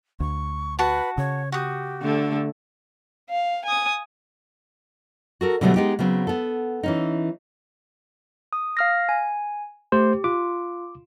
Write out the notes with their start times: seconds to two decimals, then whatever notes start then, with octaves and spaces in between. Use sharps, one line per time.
0.20 D2 C#6
0.79 F#4 B4 A5
1.18 C#3 C#5
1.52 F#4 G4 D#6
2.02 D3 A3
3.30 F5
3.65 G#5 D#6
5.41 F#4 A4 A#4
5.61 B2 D3 F#3 G3 A3 B3
5.76 G#3 B3 D#4 G4
5.99 C#3 F#3 B3 C4
6.27 B3 A4
6.83 E3 C#4 D#4
8.53 D#6
8.77 F5 F6 A#6
9.09 G#5
9.92 A3 G4 C5
10.24 F4 D6